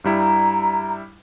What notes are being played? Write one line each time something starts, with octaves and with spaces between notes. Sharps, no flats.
G2 G3 E4 A#5